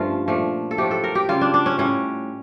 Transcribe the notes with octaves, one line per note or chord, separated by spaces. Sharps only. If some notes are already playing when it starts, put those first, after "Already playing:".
Already playing: G2 F3 A3 C#4 F4
A#2 F3 A3
A4
A2 F3 A3 G4
A4
A#4
G4
C#3 G3 F4
D4
D4
C#4
A2 G3 C#4